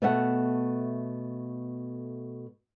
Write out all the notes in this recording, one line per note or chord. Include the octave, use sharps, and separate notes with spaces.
B2 A3 E5 F#5